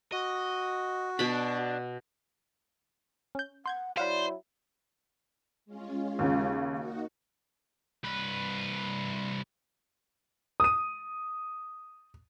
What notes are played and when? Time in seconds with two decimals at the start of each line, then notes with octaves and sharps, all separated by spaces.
0.12 F#4 D#5
1.19 B2 D4 B5
3.35 C#4 G6
3.66 F#5 C6 G6 G#6
3.97 F#3 E4 C5 D5 F5 F#5 B5
5.66 G#3 C#4 F4
6.19 D#2 C#3
6.72 A#3 D#4 F#4
8.04 C2 B4
10.60 D#6 D#7